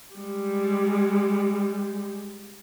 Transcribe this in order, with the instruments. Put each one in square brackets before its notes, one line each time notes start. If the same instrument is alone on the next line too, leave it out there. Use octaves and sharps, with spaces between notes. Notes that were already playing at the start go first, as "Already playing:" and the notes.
[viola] G3 G#3